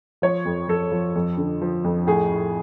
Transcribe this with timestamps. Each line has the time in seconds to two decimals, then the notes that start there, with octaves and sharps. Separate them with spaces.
0.22 F3 C#5
0.45 F2
0.68 F2 A4
0.92 F3
1.15 F2
1.38 D3
1.61 F3
1.84 F2
2.07 A2 G#4
2.31 A2